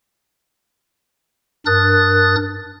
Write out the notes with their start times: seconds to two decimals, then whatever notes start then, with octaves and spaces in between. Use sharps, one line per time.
1.66 G2 D4 A#4 D#6 F#6 A6